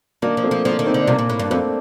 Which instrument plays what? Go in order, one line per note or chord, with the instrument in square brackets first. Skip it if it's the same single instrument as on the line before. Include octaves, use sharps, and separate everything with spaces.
[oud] D#3 [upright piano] A#3 D4
[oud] F3
[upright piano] A3 C4
[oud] F3
[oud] F3 [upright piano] A#3 D4
[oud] D#3
[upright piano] C4 D#4
[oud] D3
[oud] C3 [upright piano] A#3 D4
[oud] A#2
A2
G2
[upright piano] D4
[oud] F2 [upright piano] A3 C4